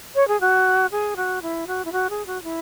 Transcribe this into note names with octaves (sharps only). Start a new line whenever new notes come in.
C#5
G#4
F#4
G#4
F#4
E4
F#4
E4
F#4
G#4
F#4
E4